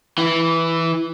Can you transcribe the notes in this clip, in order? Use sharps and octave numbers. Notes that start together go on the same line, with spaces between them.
E3